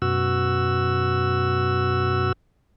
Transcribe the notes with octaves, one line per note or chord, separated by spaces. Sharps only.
F#2 B2 F#4 E6